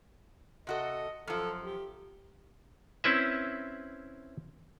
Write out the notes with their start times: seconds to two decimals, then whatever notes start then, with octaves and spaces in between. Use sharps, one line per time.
0.67 C3 F#4 A4 D#5
1.27 F#2 F3 A4
1.63 G4
3.04 C4 C#4 E4 B4 E5